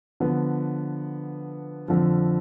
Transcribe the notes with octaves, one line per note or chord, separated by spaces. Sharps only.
D3 F3 B3
F2 D3 F3